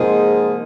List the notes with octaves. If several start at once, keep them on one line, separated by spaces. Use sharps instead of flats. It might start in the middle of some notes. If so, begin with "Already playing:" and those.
Already playing: G#2 C3 F3 A#3 D#4 G#4